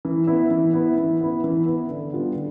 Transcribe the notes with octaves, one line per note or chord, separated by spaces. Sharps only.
E3
B3 E4
E3
B3 E4
E3
B3 E4
E3
B3 E4
D3
G3 B3 D4 F4
D3